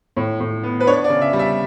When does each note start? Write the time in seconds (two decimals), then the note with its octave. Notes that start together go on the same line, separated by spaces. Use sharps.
0.17 A2
0.40 A2
0.63 B3
0.80 B4
0.87 D4 C#5
1.04 D5
1.10 C#3
1.21 E5
1.33 G3
1.39 E5